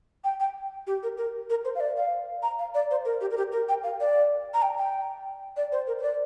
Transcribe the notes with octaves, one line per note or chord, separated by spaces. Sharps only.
G5
G5
G4
A#4
A#4
A#4
C5
F5
D5
F5
A#5
F5
D5
C5
A#4
G4
A#4
G4
A#4
G5
F5
D5
A#5
G5
G5
D5
C5
A#4
C5
D5